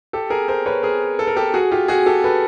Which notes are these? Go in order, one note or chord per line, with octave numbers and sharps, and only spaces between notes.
G4 A4
G#4 A#4
A#4 C5
B4 C#5
G#4 A#4
A4
A#4
G4 A4
F#4 G#4
F4 G4
F#4 G#4
G4 A4
A4 B4